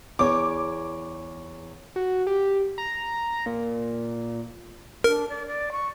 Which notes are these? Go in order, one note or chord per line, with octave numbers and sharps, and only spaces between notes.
E2 C#5 D6
F#4
G4
A#5
A#2
D4 A#4
D5
D5
C#6